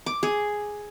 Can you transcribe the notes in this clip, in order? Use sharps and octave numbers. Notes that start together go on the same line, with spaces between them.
D6
G#4